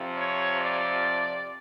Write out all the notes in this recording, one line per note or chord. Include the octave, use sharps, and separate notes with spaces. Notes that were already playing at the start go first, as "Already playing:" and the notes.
Already playing: F2 C3 F3
C#5
D5